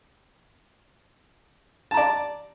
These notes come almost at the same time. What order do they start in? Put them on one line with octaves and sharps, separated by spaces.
A5 A#5 D5